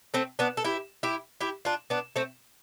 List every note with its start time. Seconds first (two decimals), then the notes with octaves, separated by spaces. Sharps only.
0.14 A3 C4
0.39 B3 D4
0.57 A4
0.64 E4 G4
1.03 E4 G4
1.41 E4 G4
1.65 D4 F4
1.90 B3 D4
2.16 A3 C4